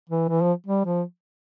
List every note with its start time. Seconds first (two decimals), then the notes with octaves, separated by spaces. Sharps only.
0.09 E3
0.29 E3
0.41 F3
0.67 G3
0.85 F3